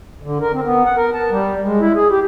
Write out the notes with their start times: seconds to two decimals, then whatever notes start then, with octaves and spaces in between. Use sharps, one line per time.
0.23 D3
0.41 A#4
0.53 C4
0.65 B3
0.85 F#5
0.97 A#4
1.13 A5
1.31 G3
1.63 G#3
1.81 E4
1.95 G#4
2.10 G4